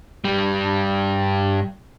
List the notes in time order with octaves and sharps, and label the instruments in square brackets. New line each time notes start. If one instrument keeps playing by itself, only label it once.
[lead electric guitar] G2 G3